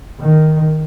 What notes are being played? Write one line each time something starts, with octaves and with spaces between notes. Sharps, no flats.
D#3